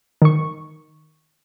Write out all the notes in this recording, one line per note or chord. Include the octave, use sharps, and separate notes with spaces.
D#3 C#6